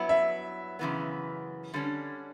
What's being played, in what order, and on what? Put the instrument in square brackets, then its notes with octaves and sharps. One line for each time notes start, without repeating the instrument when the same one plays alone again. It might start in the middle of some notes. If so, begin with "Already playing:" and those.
Already playing: [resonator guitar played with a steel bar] G2 F#3 B3 E4
[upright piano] E5
[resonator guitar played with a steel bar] F#2 C#3 E3 B3
D3 G3 C#4